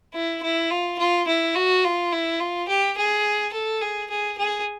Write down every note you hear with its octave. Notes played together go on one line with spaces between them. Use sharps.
E4
E4
F4
F4
E4
F#4
F4
E4
F4
G4
G#4
A4
G#4
G#4
G#4